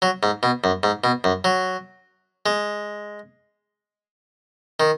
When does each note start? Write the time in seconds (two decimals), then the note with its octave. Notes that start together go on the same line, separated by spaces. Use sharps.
0.02 F#3
0.23 G#2
0.43 B2
0.64 F#2
0.83 G#2
1.04 B2
1.24 F#2
1.44 F#3
2.46 G#3
4.80 D#3